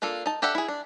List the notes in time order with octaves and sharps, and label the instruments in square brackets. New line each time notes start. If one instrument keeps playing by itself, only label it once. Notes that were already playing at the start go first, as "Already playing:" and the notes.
[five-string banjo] A#3 D4 F4 A4
D#4 A5
D4 G4 A4 E5 F#5
E4 G#4
D4